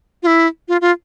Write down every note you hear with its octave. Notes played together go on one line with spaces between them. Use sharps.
F4
E4
F4
F4